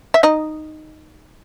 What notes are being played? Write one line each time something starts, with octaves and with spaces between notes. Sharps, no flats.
E5
D#4 D#5